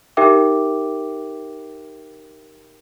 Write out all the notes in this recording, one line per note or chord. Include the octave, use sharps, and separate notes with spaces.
D#4 G4 A#4 E5 G5 D6